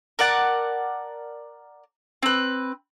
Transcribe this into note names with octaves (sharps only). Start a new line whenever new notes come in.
A#4 D5 F#5 A5
C4 B4